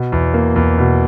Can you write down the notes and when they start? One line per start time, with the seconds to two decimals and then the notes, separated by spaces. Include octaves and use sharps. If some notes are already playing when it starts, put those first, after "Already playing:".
Already playing: B2
0.12 E2
0.34 A#3
0.56 E2
0.78 B2